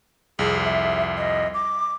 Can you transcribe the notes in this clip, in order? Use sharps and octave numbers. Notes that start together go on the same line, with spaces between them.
C2 F2 G#4
E5
D#5
D6